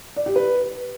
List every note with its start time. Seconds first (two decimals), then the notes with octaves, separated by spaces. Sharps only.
0.16 D5
0.26 G4
0.36 B4